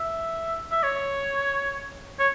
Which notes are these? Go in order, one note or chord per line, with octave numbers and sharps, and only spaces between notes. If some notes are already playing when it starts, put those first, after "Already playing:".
Already playing: E5
E5
C#5
C#5